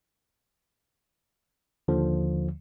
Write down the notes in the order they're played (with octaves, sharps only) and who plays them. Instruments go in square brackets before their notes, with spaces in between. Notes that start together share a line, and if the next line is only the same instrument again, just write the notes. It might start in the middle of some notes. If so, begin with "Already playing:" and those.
[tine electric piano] D#2 D3 F3